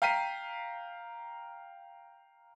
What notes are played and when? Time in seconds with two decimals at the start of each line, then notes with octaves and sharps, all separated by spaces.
0.02 F5 G5 A#5 B6 C7 D#7